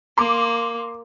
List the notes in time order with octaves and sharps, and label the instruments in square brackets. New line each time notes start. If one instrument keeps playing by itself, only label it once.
[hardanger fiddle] A#3 [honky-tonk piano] C6 D6